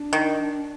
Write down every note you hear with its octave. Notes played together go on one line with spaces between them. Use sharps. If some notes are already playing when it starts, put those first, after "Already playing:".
Already playing: D4
D#3